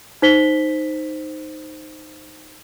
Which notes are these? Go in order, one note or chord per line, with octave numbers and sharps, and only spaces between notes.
D#4 C5 B6 G7